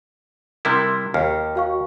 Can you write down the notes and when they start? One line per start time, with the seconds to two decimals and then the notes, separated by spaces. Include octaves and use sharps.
0.65 C3 G3 E4 A#4 C6
1.14 D#2 F6
1.56 F#4 F5 C#6